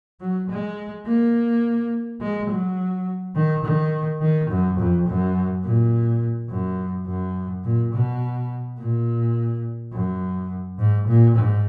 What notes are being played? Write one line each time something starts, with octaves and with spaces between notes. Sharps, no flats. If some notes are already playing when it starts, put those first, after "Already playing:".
F#3
G#3
A#3
G#3
F#3
D#3
D#3
D#3
F#2
F2
F#2
A#2
F#2
F#2
A#2
B2
A#2
F#2
G#2
A#2
G#2